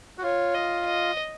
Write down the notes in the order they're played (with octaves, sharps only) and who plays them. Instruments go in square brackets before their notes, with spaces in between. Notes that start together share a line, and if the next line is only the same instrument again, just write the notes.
[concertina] F#4
[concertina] F4 [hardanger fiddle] C#5
[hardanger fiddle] D#5
D#5